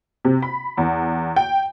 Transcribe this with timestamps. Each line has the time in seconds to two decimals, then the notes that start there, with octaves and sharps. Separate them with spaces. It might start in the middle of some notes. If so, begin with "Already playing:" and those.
0.25 C3
0.42 B5
0.78 E2
1.36 G5